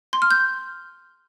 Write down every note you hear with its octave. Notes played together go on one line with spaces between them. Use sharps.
C6
F6
G6